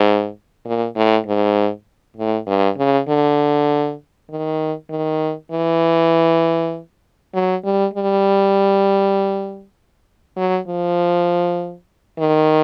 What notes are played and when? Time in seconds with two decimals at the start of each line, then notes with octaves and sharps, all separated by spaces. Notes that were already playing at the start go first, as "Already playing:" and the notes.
Already playing: G#2
0.65 A#2
0.96 A2
1.27 G#2
2.17 A2
2.47 G2
2.77 C#3
3.08 D3
4.30 D#3
4.90 D#3
5.52 E3
7.34 F#3
7.65 G3
7.94 G3
10.37 F#3
10.68 F3
12.19 D#3